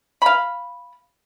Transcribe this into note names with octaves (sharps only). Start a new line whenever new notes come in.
F5 B5